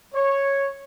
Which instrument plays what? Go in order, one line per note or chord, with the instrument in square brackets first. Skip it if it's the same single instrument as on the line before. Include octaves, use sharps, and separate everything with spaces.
[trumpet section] C#5